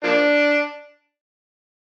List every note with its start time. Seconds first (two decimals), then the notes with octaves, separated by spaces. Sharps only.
0.04 F3 A#3 D4